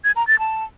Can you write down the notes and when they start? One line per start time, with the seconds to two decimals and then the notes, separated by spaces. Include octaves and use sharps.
0.04 G#6
0.16 A#5
0.27 A6
0.39 A5